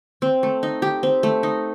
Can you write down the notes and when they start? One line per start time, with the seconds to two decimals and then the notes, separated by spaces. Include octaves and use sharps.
0.22 C4
0.43 A3
0.63 D#4
0.82 G4
1.03 C4
1.23 A3
1.43 D#4